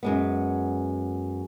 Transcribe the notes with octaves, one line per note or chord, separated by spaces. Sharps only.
F#2 G#3 B3